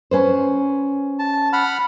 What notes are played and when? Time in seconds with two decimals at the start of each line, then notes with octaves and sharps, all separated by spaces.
0.11 C#4 B4 C5
1.19 A5
1.53 F#5 B5 F6